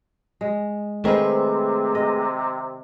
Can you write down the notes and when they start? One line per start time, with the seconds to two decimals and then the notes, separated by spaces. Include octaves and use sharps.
0.41 G#3
1.05 C3 D#3 A3 C4 G#4 B4
1.95 D#5